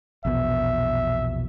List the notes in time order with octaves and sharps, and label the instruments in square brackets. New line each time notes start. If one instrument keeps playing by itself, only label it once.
[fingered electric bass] A#1 E2 B2 [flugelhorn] E5